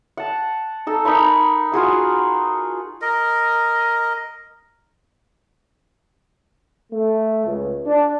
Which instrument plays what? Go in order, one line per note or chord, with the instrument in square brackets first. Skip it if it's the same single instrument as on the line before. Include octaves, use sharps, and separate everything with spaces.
[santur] F#5 A5
D#4 A4
D#4 A#4 B5 C#6
F4 F#4 G#4 F#5
[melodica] A#4 D#5
[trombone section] A3
C#2
D4